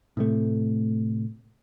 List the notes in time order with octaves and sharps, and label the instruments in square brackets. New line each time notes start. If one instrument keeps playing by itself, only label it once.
[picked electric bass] A2 C3 A3